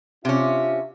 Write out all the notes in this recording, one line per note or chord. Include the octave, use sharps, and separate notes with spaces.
C3 C#4 D4 F4 E5